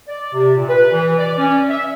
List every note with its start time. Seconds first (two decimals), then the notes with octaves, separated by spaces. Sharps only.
0.08 D5
0.33 C3
0.56 A#2
0.69 B4
0.92 E3
1.18 D5
1.37 C#4
1.69 E5